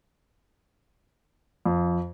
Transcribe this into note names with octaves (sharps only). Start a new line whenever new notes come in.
F2